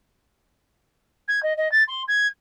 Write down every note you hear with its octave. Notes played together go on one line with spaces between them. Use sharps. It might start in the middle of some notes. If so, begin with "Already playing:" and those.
G#6
D#5
D#5
A6
C6
G#6